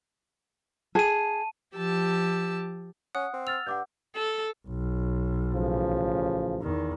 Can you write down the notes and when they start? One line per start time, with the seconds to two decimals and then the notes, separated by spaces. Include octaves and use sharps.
0.95 G#4 A5 D#7
1.75 F3 G4 A5 E6
3.15 C#4 F#5 D#6 F#6
3.33 C4
3.47 E6 F6 A6 F7
3.66 G2 F#5 D6 G6
4.15 A4
4.68 B1
5.54 A1 C#3 F3
6.62 E2 D#3